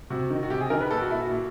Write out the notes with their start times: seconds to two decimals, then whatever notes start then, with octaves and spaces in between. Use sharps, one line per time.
0.10 C3 F#4
0.30 D#3
0.43 F#4
0.50 C3 G4
0.61 G#4
0.70 D#3 A#4
0.81 B4
0.91 A#2 A4
1.01 F#4
1.11 E4
1.21 F#4
1.31 A#2